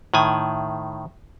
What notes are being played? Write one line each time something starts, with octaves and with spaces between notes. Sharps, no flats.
A2 D#3 G#5